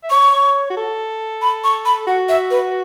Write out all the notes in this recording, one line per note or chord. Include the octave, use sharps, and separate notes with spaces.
E5
C#5 C#6
F#4
A4
B5
C#6
B5
F#4 F#5
E5
B4